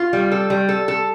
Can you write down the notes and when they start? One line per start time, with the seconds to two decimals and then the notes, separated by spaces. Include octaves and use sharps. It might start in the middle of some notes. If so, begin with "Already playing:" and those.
Already playing: F4
0.13 G3
0.32 A4
0.50 G3
0.69 A4
0.88 A4